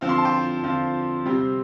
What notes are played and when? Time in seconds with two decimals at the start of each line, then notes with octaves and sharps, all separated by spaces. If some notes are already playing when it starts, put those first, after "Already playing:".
0.01 D3 F3 C4 F4
0.09 C6
0.18 A5
0.25 G5 C6
0.63 D3 F3 C4 F4
1.25 C3 G3 C4